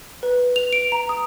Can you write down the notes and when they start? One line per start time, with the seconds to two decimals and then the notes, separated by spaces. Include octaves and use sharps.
0.23 B4
0.56 F7
0.73 D7
0.92 A#5
1.09 D#6